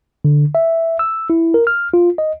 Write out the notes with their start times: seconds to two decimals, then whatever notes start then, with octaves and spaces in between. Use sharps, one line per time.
0.25 D3
0.55 E5
0.99 E6
1.30 E4
1.54 A#4
1.67 F6
1.94 F4
2.18 D#5